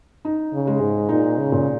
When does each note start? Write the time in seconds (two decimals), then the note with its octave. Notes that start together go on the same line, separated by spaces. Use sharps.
0.25 D#4
0.53 C#3
0.67 G#3
0.81 G#2
1.09 A#2 D#4
1.38 C#3
1.52 A#2